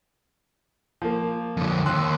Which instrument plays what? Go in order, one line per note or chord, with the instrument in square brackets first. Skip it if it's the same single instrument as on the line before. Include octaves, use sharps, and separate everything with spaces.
[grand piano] F3 A#3
[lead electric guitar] F2 D3
[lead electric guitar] D#2 [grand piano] C6 E6 F#6